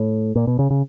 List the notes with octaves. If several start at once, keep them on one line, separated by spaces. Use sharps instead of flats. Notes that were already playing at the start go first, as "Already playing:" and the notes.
Already playing: A2
A#2
B2
C#3
C#3